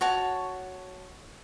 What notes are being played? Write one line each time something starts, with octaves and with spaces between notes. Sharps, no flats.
F#4 C#5 A5